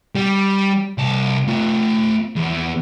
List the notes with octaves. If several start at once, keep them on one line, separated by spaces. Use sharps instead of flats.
G3
C2 A5
A3 F4
E2